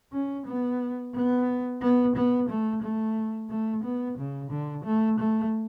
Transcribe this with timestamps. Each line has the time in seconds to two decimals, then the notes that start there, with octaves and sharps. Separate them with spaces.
0.13 C#4
0.46 B3
1.14 B3
1.81 B3
2.16 B3
2.49 A3
2.82 A3
3.50 A3
3.84 B3
4.18 C#3
4.51 D3
4.85 A3
5.19 A3